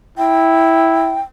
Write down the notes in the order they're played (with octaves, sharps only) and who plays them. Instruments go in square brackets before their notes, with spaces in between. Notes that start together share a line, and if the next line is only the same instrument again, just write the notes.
[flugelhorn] E4 [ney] G5